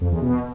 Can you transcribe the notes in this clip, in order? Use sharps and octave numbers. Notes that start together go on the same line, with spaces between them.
F2
E2
B2